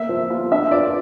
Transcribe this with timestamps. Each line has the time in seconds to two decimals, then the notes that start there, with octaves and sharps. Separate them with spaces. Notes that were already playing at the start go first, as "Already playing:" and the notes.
Already playing: A#3 E5
0.09 F3
0.30 F4
0.51 D4 E5
0.71 F4 D5